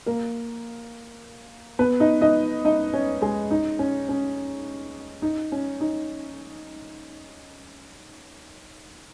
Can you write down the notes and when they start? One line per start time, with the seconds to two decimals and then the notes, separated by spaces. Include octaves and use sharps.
0.06 A#3 A#4
1.79 B3 B4
2.00 D#4 D#5
2.21 D#4 D#5
2.65 D#4 D#5
2.94 C#4 C#5
3.21 G#3 G#4
3.51 D#4
3.79 C#4
4.09 C#4
5.22 D#4
5.52 C#4
5.81 D#4